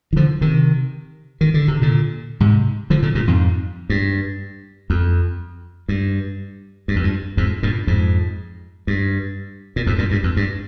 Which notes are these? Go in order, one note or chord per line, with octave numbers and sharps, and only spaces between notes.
D#3
D3 F3
C3 D#3
D#3
D3
C3
A#2 D3
G#2 C3
D3 F3
A#2 D3
G2 A#2
F2 G#2
G2
F2
G2
G2
F2
G2
F2 G#2
G2 A#2
F2 G#2
G2
A#2
F2 G#2
G2 A#2
G2
F2
G2